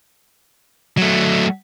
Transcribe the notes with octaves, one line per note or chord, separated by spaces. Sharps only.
F#3 A3